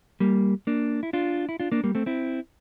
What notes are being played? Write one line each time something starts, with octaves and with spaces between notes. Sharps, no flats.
G3 A#3
A#3 D4
E4
D4 F4
E4
D4 F4
A#3 D4
G3 A#3
A3 C4
C4 E4